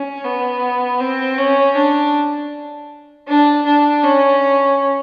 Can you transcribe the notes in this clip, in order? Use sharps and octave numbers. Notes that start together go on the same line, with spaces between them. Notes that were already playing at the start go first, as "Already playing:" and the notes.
Already playing: C#4
B3
C4
C#4
D4
D4
D4
C#4